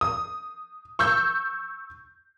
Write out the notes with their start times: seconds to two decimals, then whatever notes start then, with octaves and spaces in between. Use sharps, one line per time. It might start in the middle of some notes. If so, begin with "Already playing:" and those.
0.01 D#6
0.99 C#6 E6 G6